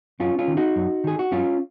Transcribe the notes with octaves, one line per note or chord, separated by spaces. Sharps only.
F#2 C#4 F4
C#4 F4
D#3
D#4 F#4
F#2
D#3 G#4
F#4
F#2 C#4 F4